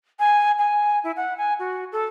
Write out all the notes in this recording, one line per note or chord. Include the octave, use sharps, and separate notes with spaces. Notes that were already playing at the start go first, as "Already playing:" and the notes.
G#5
G#5
E4
F#5
G#5
F#4
A4